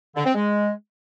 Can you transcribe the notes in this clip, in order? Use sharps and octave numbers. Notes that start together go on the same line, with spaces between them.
D3
C4
G#3